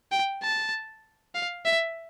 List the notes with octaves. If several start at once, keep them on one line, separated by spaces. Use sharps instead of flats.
G5
A5
F5
E5